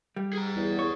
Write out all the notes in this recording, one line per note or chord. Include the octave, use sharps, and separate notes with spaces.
G3
G#4 A#5
E2
C#5